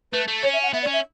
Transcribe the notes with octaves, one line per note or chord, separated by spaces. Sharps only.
A3 B4
A3
C#4 C#5
E5
F#5
B3 E5
D5
C#4
E5